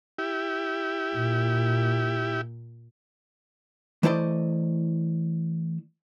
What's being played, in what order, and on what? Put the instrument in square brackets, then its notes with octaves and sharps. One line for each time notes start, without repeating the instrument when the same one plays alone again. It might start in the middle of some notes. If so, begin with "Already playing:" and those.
[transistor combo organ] E4 G4
[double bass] A#2
[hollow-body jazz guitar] E3 A3 E4 C5 D5 D#5